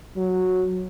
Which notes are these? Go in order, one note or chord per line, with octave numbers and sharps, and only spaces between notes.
F#3